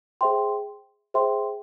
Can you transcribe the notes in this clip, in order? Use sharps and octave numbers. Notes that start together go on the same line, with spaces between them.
G#4 C5 E5 G5 C6
G#4 C5 E5 G5 C6